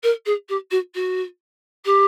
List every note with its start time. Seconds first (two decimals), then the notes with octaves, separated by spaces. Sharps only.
0.03 A#4
0.26 G#4
0.49 G4
0.71 F#4
0.94 F#4
1.85 G4